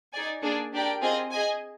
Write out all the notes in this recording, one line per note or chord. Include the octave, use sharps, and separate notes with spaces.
D#4 G#4 D5 G#5
A#3 D4 G#4
D4 G4 A#4 D5 G5
C4 F4 G#4 D#5 G#5
G#4 D#5 G#5